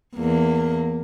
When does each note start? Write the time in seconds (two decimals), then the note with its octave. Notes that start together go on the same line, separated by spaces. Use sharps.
0.15 E2 A#3